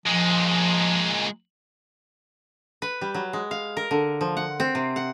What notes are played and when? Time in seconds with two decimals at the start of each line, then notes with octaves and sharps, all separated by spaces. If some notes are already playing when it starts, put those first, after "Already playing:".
0.06 A#2 F3 G#3
2.82 B4
3.01 G3
3.14 F#3
3.33 G#3
3.51 F5
3.77 A#4
3.91 D3
4.21 F3
4.37 F#5
4.60 C4
4.75 C3
4.96 F#5